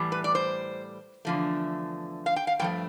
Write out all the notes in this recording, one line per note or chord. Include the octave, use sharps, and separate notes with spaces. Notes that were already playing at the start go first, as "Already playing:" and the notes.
Already playing: A2 E3 G3
B4
D5
C5
E2 D3 F3 A3
F5
G5
F5
G2 F3 A3 G5